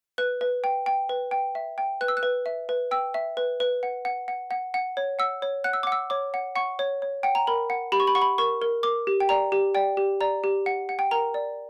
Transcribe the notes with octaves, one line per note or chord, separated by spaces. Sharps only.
B4 F#6
B4
G5
G5
B4
G5
E5
G5
B4 F#6
E6
F#6
B4
E5
B4
G5 E6
E5
B4
B4
F#5
F#5
F#5
F#5
F#5
C#5
F#5 E6
C#5
F#5 F#6
E6
F#5 D6
E6
C#5 D6
F#5
F#5 C#6
C#5
C#5
F#5 G5
A#5
A#4 B5
F#5
G4 B5
C#6
B5
F#5 C#6
B5
A#4 C#6
A#4
A#4 D6
G4
G5
D5 A#5
G4
D5 G5
G4
D5 A#5
G4
F#5
F#5
G5
A#4 A#5
D5